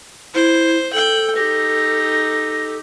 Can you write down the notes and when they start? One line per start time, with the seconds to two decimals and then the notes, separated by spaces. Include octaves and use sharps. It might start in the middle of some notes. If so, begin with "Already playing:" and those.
0.34 E4 C5
0.93 A4 G5 F#7
1.36 D#4 G4 A#6